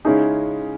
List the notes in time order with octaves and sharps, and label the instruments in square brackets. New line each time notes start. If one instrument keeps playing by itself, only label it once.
[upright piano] C#3 G#3 C#4 E4 G#4 [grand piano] D#4